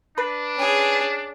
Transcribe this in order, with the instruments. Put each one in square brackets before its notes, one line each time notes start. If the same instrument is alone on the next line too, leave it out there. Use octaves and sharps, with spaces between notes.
[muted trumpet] D4 [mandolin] B4
[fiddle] C#4 G#4